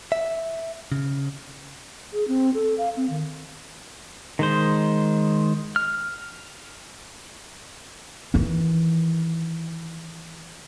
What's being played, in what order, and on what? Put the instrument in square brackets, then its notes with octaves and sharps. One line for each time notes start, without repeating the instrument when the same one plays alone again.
[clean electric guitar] E5
C#3
[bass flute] G#4
C4
A4
F5
C4
D#3
[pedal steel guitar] D#3 G#3 C5
F6
[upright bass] D#3 E3